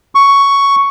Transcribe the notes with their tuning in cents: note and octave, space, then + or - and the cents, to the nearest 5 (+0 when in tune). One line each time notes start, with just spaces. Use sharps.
C#6 +5